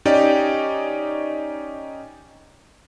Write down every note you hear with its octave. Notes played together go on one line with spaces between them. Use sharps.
C#4 D#4 G4 D5